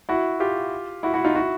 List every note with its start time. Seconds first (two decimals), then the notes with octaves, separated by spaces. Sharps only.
0.09 E4 F#4
0.40 F4 G4
1.03 E4 F#4
1.14 E4 F#4
1.24 D#4 F4
1.35 E4 F#4